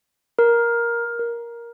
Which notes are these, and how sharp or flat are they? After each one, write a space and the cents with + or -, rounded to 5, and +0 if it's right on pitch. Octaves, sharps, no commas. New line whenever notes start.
A#4 +10
A#4 +10